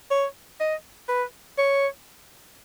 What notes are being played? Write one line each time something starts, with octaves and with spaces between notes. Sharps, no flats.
C#5
D#5
B4
C#5